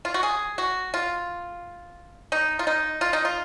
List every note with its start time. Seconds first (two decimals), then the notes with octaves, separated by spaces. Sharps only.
0.05 F4
0.14 F#4
0.23 G#4
0.58 F#4
0.94 F4
2.32 D#4
2.59 F4
2.67 D#4
3.01 F4
3.13 D#4
3.25 F4